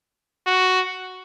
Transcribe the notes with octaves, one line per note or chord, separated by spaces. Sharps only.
F#4